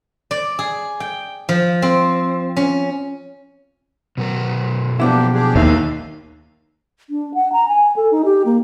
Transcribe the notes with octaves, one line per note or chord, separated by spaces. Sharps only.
D5
G#4
G5
F3
C4
C#4
B2 F#3 A#4
F3 A#3 B3 D4 E4 G4
D4 G4 G#4
D#2 D#3 G#3 E5 F5
D4
F#5
A#5
G#5
A4
D#4
G4
A#3